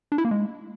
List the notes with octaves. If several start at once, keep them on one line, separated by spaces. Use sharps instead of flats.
D4
E4
A#3
G#3